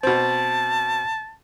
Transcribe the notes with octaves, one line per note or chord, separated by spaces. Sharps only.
B2 C4 A5